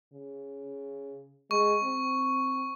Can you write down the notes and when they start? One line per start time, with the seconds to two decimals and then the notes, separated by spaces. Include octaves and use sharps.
0.14 C#3
1.51 G#3 C#6
1.83 C4